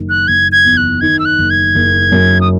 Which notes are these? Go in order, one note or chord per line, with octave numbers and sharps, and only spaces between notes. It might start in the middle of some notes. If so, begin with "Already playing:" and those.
Already playing: F#1 D#3
F#6
F#1 G#6
G#6
E2
F#6
D#3 G#6
E6
F#6
F#1
G#6
F#1
F#2
D#6